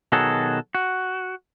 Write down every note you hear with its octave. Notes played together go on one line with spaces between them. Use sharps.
B2 D#3 F#3 F#4 G#4 A4
F#4